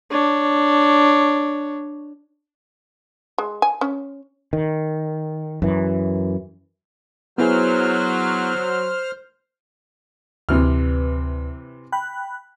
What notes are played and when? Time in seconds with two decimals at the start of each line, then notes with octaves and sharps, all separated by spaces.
0.11 D4 C#5
3.38 G#3
3.62 G#5
3.81 C#4
4.53 D#3
5.62 F#2 E3
7.38 F#3 B3 E4 G#4 C5 F6
10.49 D2 C3 E3 B4 F6
11.92 G5 B5 F#6